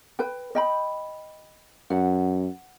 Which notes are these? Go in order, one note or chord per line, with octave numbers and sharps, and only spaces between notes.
B4 G5
D#5 G5 B5
F#2 F#5